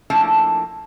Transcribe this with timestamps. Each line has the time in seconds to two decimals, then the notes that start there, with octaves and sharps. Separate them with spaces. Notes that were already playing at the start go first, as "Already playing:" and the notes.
0.10 F3 A3 A#3 C#4 D4 E4